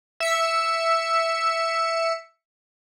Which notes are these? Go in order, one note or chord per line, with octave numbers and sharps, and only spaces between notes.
E5 C#7 E7